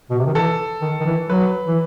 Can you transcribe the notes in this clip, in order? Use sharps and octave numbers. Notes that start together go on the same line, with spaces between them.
B2
C3
D#3
E3 A4
D#3
D#3
E3
F#3 B4
E3